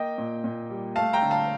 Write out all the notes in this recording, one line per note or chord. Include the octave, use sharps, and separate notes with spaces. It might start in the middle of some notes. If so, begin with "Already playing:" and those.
Already playing: A#3 D#5 G5
A#2
A#2
G3
A3 F5 A5
G5 A#5
D3
F5 A5